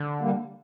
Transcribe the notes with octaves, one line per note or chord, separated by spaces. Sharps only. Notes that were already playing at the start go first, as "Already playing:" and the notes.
Already playing: D3
G3 A#3